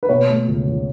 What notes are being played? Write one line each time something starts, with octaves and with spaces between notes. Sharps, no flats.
B4
B2 C#5
A3
C#2
C#2